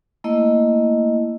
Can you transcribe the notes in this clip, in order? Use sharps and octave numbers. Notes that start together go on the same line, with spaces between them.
A3 A#3 E4 D#5